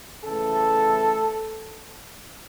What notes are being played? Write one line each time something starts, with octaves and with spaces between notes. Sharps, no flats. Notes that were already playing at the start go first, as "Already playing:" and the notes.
C#3 E3 A3 A4